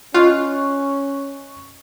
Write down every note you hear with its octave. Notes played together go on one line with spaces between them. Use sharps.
C#4 F4 D#5 C#6 F#6